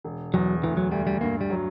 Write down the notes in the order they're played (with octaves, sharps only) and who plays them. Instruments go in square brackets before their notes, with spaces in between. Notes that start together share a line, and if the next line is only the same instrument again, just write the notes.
[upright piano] E1
[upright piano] E2 [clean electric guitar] F#3
[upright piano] D2 [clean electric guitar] E3
[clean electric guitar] F#3
[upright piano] D2 [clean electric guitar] G3
[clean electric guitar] G3
[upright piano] G2 [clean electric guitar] A#3
[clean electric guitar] G3
[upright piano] F#3